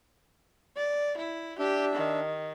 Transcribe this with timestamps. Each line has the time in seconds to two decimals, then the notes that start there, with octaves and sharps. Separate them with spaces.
0.77 D5
1.18 E4
1.59 D4 G4 E5
1.95 D#3